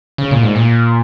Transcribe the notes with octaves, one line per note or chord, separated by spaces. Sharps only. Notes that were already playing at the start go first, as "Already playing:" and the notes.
C#3
A#2
G#2
A#2